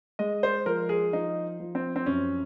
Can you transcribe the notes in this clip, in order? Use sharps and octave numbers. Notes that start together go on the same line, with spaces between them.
G#3 D#5
C5
F3 A#4
G#4
F3 D#4
F3
C4
C4
F#2 C#4